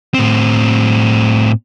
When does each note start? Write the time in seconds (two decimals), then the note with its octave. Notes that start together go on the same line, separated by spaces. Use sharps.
0.14 A2 C4